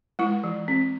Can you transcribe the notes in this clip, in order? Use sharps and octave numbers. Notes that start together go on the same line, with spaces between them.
G#3 E4
E3
C4